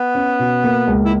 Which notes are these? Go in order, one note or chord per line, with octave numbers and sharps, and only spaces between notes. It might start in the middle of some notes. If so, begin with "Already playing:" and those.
Already playing: B3
C#4
B2
A#3
C#2
E4